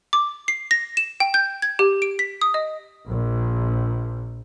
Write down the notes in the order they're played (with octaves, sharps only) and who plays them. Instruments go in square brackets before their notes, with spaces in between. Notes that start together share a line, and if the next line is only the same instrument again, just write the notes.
[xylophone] D6
C7
A#6
E7
G5
G6
G#6
G4
D7
B6
D#6
D#5
[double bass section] A#1